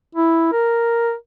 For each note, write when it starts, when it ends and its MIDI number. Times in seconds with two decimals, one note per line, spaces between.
0.15 0.49 64
0.52 1.13 70